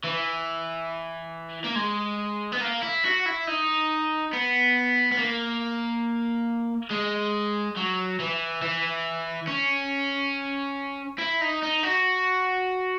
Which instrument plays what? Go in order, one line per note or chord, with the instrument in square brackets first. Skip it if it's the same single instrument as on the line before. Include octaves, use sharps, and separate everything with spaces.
[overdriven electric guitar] E3
A#3
G#3
B3
A#3
E4
F#4
E4
D#4
B3
B3
A#3
G#3
F#3
E3
E3
C#4
E4
D#4
D#4
F#4